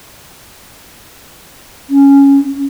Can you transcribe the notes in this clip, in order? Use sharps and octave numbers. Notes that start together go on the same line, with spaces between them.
C#4